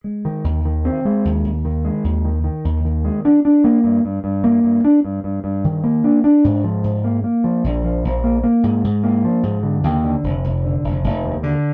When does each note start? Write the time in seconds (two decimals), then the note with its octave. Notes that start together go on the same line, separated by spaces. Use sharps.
0.04 G#3
0.25 D#3
0.44 D#2
0.65 D#3
0.85 C4
1.05 G#3
1.25 D#2
1.45 D#2
1.65 D#3
1.85 G#3
2.04 D#2
2.25 D#3
2.44 D#3
2.65 D#2
2.85 D#3
3.05 G#3
3.25 D4
3.45 D4
3.64 A#3
3.84 G2
4.05 G2
4.24 G2
4.44 A#3
4.64 G2
4.84 D4
5.04 G2
5.24 G2
5.44 G2
5.64 D#3
5.84 A#3
6.04 D4
6.24 D4
6.44 G#2
6.64 F3
6.84 G#2
7.04 A#3
7.24 A#3
7.44 F3
7.64 A#1
7.84 F3
8.04 A#1
8.24 A#3
8.43 A#3
8.63 G#2
8.84 G#2
9.04 A#3
9.24 F3
9.43 G#2
9.63 D3
9.83 D#2
10.03 D3
10.23 F1
10.44 F1
10.64 D3
10.84 F1
11.04 F1
11.23 D#2
11.43 D3